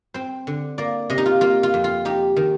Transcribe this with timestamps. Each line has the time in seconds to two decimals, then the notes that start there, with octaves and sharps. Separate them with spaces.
0.14 C4 C5
0.47 D3
0.78 A#3 D5
1.10 C3 D#5
1.18 D#4
1.26 F4
1.41 A#3 F4
1.63 F4
1.74 F2
1.84 F4
2.05 D#4 G4
2.36 D#3